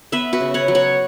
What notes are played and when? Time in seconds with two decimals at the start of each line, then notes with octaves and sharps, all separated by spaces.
0.12 B3 B4 E5
0.33 F#4 B4
0.40 C#3
0.54 C#5 F#5
0.68 F#3
0.75 C#5 F#5